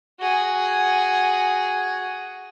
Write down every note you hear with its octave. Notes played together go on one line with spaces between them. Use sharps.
F#4 G#4